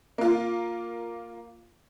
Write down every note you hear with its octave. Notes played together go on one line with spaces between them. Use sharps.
A#3 F4